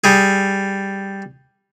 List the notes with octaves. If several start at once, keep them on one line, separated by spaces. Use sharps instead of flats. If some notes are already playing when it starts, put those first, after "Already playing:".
G3 G#4